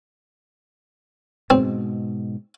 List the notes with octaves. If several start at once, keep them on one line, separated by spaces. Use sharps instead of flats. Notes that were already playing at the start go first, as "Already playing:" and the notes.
G#2 B2 G#3 C4